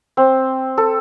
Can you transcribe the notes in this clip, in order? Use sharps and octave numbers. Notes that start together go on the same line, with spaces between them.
C4
A4